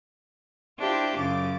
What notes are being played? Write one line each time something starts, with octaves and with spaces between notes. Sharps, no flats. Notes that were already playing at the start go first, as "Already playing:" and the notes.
D4 E4 F4 G4 C5 G5
F#2 C#3 D6 A6